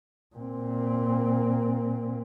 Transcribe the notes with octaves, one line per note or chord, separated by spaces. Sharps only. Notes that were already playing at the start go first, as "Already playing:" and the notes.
A#2 C4